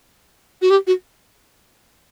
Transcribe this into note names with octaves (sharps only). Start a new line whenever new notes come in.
F#4
G4
F#4